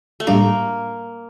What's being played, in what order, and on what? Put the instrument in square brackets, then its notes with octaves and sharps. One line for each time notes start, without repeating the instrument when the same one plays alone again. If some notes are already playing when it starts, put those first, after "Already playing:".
[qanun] A3
[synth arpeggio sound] A2 G3 D4 [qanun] A#3